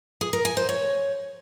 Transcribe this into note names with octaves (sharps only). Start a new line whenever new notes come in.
G#4
A#4
G#5
C5
C#5